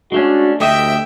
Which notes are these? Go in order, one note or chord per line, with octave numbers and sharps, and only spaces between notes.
G#3 A3 C#4 D4 F#4
D2 A3 G4 D#5 E5 G5